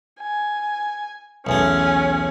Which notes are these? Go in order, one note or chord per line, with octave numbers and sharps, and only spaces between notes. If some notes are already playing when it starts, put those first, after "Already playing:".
G#5
B1 E2 A3 C#4 G#5